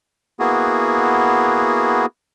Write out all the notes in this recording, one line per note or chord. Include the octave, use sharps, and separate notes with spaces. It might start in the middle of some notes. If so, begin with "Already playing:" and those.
A#3 B3 E4 F#4 G#4